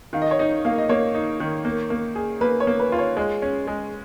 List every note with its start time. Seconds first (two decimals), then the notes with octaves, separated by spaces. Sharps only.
0.13 D#3 F5
0.22 D#5
0.31 C#5
0.39 D#4 D#5
0.65 A#3 F5
0.78 D#5
0.89 A#3 C#5
1.15 D#4
1.40 D#3
1.65 A#3
1.90 A#3
2.15 G#4
2.41 A#3 B4
2.60 C#5
2.67 A#3
2.79 B4
2.92 F4
2.99 C#5
3.17 G#3 C#5
3.42 C#4
3.68 G#3